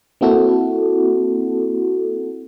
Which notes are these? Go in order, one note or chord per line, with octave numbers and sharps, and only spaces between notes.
A#3 C4 E4 F#4 A4